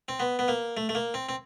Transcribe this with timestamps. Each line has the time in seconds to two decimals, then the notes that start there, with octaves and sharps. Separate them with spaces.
0.08 C4
0.20 B3
0.39 B3
0.48 A#3
0.77 A3
0.89 A3
0.95 A#3
1.14 C4
1.29 C4